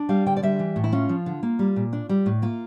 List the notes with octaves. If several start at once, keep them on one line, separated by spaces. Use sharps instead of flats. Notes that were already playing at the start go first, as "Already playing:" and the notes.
Already playing: D4
G3 F5
D3 G5
D5
G3 E5
E3
A2
E4
C#4 F4
F3
D3
A#3
G3
A#2
D4
G3
A2
A#3 F4